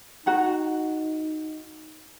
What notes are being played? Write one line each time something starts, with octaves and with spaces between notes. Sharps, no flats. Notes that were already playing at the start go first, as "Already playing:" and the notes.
D#4 F#4 F#5 A#5